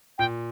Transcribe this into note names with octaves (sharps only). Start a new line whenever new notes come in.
A#2 G5